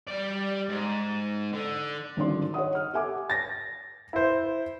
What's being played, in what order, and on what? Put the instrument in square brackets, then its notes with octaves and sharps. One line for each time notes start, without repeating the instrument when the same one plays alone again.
[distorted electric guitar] G3 D5
G#2
D3
[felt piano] G#1 D3 G3 C#4 D5 C6
C#5 D#5 F#5 D#6
F6
G4 A4 E5 F#5 G#5 D6
[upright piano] A6 A#6
E4 C5